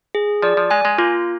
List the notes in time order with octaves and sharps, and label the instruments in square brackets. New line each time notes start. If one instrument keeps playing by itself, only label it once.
[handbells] G#4
[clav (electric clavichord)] F3 [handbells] D5
[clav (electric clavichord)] F3
[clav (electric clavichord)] G#3 [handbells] G#5
[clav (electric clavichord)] G#3
[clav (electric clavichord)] A#3 [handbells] F4